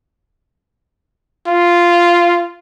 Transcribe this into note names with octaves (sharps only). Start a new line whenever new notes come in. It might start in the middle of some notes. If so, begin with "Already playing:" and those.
F4